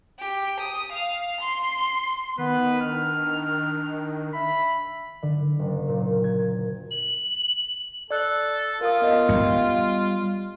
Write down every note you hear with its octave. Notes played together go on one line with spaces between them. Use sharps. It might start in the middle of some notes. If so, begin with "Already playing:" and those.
G4
D#6
F5
C6
D#3 B3 B4
D4 F6
E5 B5
D3
F#1
A#2
G#6
F#7
A4 D5 F#6
F4 A#4 F5 D#6
B3 D#5 F5
G3